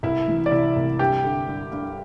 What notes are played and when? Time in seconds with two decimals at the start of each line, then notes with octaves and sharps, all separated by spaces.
0.03 C2 E4 E5
0.28 E3
0.46 D5
0.51 C3 E4 E5
0.76 C2
0.99 G2 G4 G5
1.24 D3
1.48 G2
1.72 G2